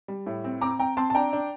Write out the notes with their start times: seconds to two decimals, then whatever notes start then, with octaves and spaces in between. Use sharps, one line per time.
0.08 G3
0.27 A2
0.44 C4
0.61 C4 A#5 D6
0.79 C4 G5 A#5
0.97 C4 A5 C6
1.10 A5
1.15 D4 G5 A#5
1.33 D4